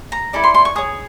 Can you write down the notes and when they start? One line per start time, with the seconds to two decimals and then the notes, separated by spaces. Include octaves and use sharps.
0.12 A#5
0.33 E4 A4 D5 B5
0.44 C6
0.54 C6
0.65 C#6
0.75 G#4 C#5 D#6